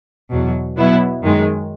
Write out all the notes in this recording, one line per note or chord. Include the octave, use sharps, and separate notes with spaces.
E2 B2 F#3
B2 F#3 B3 E4
F#2 D#3 G#3